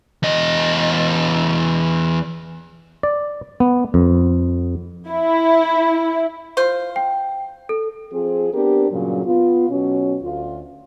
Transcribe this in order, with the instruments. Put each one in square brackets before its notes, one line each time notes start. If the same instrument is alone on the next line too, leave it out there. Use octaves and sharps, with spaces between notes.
[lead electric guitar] E2 D#5
[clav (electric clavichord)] D5
B3
F2
[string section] E4
[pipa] F4 C5
[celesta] G5
A4
[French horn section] F3 C4 G#4
B3 C4 D4 G4 A#4
G2 A#2 C#3 F#3
B3 F4
B2 F#3 C#4
D2 F4